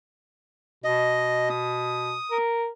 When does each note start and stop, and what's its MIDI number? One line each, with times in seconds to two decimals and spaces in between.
0.84 2.14 47
0.84 1.49 75
1.50 2.38 87
2.31 2.68 70